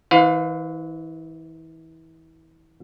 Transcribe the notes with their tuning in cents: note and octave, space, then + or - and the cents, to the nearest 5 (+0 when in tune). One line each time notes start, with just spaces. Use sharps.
E3 -35 B4 +45 F5 +25